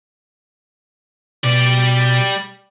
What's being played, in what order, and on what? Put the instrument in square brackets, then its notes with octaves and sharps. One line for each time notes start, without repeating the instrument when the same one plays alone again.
[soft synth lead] B2 [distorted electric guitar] G3 D5